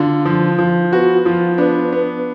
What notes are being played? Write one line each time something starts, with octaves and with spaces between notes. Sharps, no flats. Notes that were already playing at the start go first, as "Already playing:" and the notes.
Already playing: D3 F4
F3
F3
B3 F#4
F3 F4
B3 D4
B3